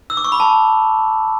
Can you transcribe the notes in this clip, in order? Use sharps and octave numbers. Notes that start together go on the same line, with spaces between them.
E6
D6
C#6
B5
A5